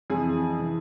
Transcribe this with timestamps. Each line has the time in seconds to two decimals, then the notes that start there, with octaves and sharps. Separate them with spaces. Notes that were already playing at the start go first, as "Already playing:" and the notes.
0.10 F2 E3 G#4
0.59 E3